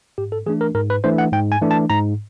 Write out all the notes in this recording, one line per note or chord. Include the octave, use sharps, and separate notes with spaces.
G#2 G4
A4
E3 A3 D4 G#4
A#4
G#2 A#4
B4
E3 A3 D4 C5
F#5
G#2 G5
G#5
E3 A3 D4
A5
G#2 A#5